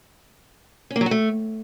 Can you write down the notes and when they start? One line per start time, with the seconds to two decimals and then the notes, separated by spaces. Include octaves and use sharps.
0.91 C#4
0.96 A#3
1.01 F#3
1.06 F#4
1.11 A3